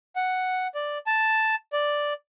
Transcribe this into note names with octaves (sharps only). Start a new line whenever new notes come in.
F#5
D5
A5
D5